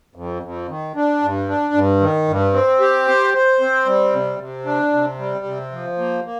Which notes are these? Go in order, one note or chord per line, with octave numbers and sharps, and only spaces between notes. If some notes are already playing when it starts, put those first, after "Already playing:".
F2
F2
D#3
D4
G2
D4
G2
D#3
G2
C4
G4
C5
C5
C4
G3
C3
C3
D4
C3
G3
C3
F3
A#3
A#3